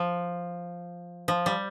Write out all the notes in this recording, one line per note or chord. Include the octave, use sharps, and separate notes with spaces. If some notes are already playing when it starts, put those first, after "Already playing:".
Already playing: F3
F3
G3